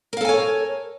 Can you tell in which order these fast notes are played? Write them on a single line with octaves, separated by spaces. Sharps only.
A#4 F5 A4 G#5 C#5